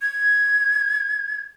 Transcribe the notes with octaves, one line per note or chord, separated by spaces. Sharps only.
G#6